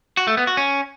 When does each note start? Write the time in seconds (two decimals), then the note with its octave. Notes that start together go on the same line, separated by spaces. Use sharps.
0.17 F#4
0.27 A3
0.37 B3
0.47 F#4
0.57 C#4